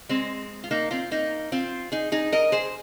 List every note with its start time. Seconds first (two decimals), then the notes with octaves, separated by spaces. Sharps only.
0.09 G#3 C4
0.64 F4
0.71 A#3 D#4
0.91 C4 F4
1.11 A#3 D#4
1.52 C4 F4
1.92 D#4 G#4
2.12 D#4 G#4
2.32 A#4 D#5
2.52 G#4 C5